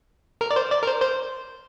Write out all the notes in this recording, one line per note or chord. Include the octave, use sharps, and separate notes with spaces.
A#4
D5
C5
D5
A#4
C5
C5